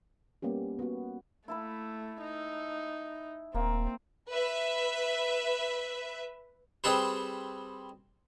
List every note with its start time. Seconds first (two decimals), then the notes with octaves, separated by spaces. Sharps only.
0.42 G3 A#3 B3 C#4 G4
0.79 B3 F#4
1.48 A3 E4 A5 B5
2.21 D#4
3.55 D#1 A#3 C4
4.30 B4 E5
6.84 G3 C4 G#4 A4 B4 C5